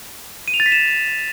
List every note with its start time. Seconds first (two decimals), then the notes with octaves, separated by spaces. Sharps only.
0.48 D#7
0.54 F7
0.60 A6
0.66 B6
0.72 E7